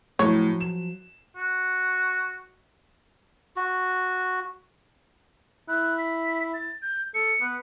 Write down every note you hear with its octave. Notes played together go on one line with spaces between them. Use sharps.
A2 F3 F#3 C#5
E7
F#4
F#4
E4 F#6
B6
A6
G6
A4 C#7
B3